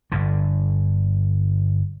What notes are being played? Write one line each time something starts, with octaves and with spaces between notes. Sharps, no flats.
G1 G2 D3